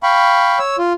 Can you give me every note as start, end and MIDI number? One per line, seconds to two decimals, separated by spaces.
0.03 0.59 77
0.03 0.59 79
0.03 0.59 83
0.03 0.59 85
0.59 0.76 73
0.59 0.76 88
0.78 0.93 65